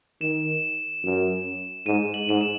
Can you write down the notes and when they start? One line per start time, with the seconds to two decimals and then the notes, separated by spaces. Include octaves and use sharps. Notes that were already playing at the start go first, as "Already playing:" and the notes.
0.21 D#3 E7
1.03 F#2
1.86 G#2 D#7
2.14 F#7
2.27 G#2 D#7
2.41 E7